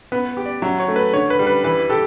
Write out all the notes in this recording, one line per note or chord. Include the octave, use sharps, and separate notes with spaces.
B3 B4
G4
D5
F#3 E5
C#5
A3
B4
D3 C#5
B4
G3
B4
E3 B4
G4 A4